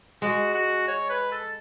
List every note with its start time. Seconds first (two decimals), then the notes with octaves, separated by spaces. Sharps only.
0.22 G#3 F#4
0.54 F#4
0.88 C#5
1.10 B4
1.32 A4